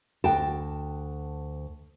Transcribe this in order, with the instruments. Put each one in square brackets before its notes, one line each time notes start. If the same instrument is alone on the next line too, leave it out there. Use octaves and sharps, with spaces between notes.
[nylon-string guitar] D2 G5 A5